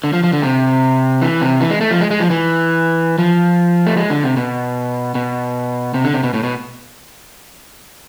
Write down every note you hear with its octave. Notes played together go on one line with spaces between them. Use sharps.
D3
F3
F3
D3
C3
E3
C3
E3
G#3
A3
F3
G#3
G#3
F3
E3
F3
A3
G#3
D3
C3
B2
B2
C3
D3
C3
B2
A2
B2